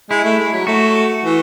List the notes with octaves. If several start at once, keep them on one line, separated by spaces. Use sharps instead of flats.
G#3 E4
A3
G#3
F#3
A3 F#4
E3